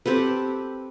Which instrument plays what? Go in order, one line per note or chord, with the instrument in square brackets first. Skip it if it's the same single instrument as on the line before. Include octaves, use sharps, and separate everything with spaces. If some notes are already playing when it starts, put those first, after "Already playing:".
[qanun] C4 G4 A4 B4